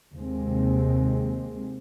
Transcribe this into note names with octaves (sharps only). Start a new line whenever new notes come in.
D#2 C3 G#3 C4